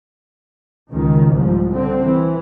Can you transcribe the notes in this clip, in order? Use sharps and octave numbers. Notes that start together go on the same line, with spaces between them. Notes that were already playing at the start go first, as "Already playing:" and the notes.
C#2 D#3
C2 G#2 F3
D3 C4
E3